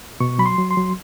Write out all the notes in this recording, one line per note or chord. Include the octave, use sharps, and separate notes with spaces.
B2 C#6
F#3 B5
C6
F#3
C6
F#3